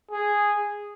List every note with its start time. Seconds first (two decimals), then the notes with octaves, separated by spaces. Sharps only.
0.11 G#4